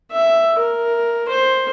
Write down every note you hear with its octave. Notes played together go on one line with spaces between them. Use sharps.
E5
A#4
C5